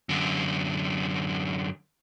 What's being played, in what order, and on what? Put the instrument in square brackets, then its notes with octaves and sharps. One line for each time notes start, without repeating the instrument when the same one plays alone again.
[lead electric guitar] F#2 D3